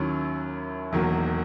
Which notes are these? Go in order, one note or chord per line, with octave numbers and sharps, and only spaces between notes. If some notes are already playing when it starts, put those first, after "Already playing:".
Already playing: D#2 D#3 F#3 C#4 E4
E1 E2 D#3 F#3 A#3